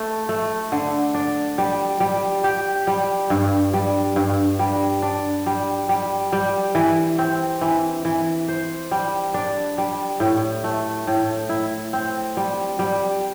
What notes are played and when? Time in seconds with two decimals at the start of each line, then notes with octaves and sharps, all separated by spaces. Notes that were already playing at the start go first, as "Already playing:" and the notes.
Already playing: A3
0.29 A3
0.72 D3
1.14 D4
1.58 G3
2.00 G3
2.44 G4
2.87 G3
3.30 G2
3.74 G3
4.16 G2
4.59 G3
5.02 D4
5.46 G3
5.89 G3
6.32 G3
6.75 E3
7.18 C4
7.61 E3
8.05 E3
8.48 C5
8.91 G3
9.34 D4
9.78 G3
10.20 A2
10.64 A3
11.07 A2
11.49 E4
11.93 C4
12.37 G3
12.79 G3